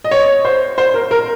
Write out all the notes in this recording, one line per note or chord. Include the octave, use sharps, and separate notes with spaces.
D#5
C#5
C5
C5
A#4
A#4